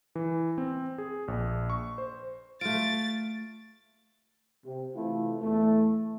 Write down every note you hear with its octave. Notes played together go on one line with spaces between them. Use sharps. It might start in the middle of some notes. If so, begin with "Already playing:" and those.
E3
C4
G#4
A#1
C#6
C5
A3 F4 A6 D7
C3
C3 E3 A3 E4 F4
E2 A3